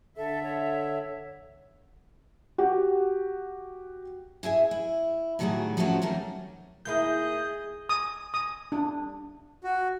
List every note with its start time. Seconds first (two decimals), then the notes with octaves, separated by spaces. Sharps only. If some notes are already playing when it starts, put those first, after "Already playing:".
0.17 D3 A4 E5
0.43 C#5
2.58 F#4 G4 F#5
4.43 E4 G#4 E5 G#5
4.71 E4
5.39 A2 D#3 F#3 G3 F#4 G#4
5.77 F3 F#3 A3 C4 C#4 F#4
6.02 D#3 G3 A3 C#4 A#4
6.85 D#2 A#3 E4 G#4 D#5 G6
7.89 D#6
8.34 D#6
8.72 D4
9.64 F#4